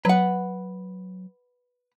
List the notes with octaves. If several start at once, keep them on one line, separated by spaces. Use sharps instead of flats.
F#3 B4 F#5